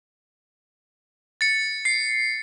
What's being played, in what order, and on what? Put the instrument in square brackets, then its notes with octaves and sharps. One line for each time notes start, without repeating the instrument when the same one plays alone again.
[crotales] A6 C#7
C7